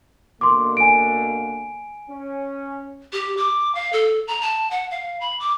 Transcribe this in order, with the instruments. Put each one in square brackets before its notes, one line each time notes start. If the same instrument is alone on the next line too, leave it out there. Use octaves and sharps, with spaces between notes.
[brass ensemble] B2 D3 A#3 [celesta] C6 D6
[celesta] G#5 D7
[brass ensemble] C#4
[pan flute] G4
D6
F5
A4
A#5
A5
F#5
F5
B5
D6